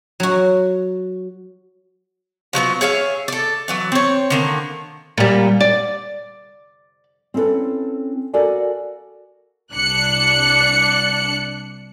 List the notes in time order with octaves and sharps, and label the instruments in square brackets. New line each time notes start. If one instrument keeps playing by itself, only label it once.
[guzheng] F#3 F#4
[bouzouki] F3 F#3 G#3 B3
G#4 C#5 E5 F5
A4 D5
E3 F#3 D5
C4 C#5
D3 D#3 A#3
[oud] A#2 G3
D5
[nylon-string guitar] C4 C#4 E4 G#4 A4 B4
F#4 A4 A#4 D5 F5 G#5
[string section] C2 D4 F#6 C#7